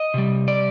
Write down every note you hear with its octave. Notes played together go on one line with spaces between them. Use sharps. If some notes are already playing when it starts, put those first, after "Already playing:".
Already playing: D#5
C3 G3
D5